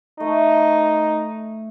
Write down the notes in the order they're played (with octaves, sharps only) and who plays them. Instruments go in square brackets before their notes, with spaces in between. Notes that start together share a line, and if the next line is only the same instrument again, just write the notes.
[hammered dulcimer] A3 [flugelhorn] D#4